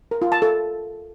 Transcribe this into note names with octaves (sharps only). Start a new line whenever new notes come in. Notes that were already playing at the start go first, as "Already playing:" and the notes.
A#4
F4
A5
A4